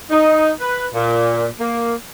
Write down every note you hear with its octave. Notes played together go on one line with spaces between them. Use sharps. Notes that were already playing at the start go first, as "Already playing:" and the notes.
D#4
B4
A#2
A#3